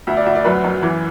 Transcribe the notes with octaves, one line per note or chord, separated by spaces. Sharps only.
D2 E5
D5
D2 E5
D5
F#2 B4
F#2
E3